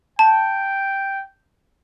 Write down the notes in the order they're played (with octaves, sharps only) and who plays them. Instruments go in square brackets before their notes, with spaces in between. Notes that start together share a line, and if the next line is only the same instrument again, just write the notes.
[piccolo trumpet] G5 [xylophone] A5